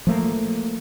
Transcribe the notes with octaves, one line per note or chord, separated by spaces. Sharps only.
F3 A3 A#3